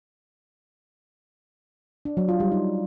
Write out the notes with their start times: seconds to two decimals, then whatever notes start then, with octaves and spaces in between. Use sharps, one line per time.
2.05 D4
2.17 F#3
2.29 F4
2.40 G3
2.52 D#4